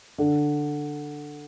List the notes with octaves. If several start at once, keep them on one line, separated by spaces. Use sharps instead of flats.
D3